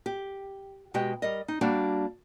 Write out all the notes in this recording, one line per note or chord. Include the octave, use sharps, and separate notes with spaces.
G4
B2 G#3 F#4 G4 D#5 G5
G3 A#4 D#5
D#4
G3 A#3 D4 F#4